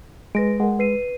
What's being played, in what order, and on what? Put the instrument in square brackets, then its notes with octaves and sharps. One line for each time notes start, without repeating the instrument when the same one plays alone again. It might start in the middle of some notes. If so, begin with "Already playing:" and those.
[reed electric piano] G#3 [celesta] B4 A#6 D7
[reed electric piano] G#3 [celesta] A#4 F#5
[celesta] B4 C7 D#7